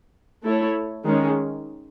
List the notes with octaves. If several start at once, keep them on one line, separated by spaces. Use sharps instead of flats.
A3 E4 A4 C#5
D#3 G#3 C#4